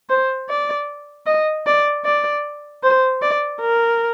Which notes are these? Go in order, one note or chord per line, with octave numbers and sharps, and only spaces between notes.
C5
D5
D#5
D5
D5
C5
D5
A#4